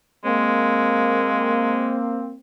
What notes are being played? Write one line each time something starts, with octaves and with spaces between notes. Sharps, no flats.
G#3 A#3 C4